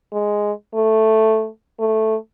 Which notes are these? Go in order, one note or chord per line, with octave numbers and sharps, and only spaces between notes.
G#3
A3
A3